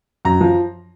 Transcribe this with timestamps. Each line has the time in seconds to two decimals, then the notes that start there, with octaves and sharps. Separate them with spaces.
0.25 F#2 A#5
0.41 F3